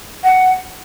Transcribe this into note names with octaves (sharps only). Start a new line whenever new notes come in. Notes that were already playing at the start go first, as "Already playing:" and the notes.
F#5